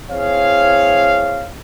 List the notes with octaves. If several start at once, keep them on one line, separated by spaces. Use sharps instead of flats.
C4 E4 G#4 C#5 F5